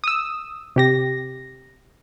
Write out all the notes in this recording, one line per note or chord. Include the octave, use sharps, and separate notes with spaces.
D#6 E6
C3 G4 A#6